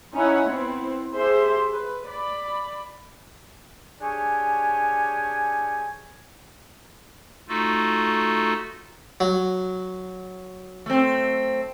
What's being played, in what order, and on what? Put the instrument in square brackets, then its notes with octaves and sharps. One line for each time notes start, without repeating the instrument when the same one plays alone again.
[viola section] C#4 D#4 E4 C#5 E5 F#5
B3 C4 E4
G4 G#4 C5 E5
B4
D5 B5
[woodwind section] D4 G4 G#4 C#5 G#5
[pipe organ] A3 D#4 F4 F#4 A4
[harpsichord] F#3
[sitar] A3 C4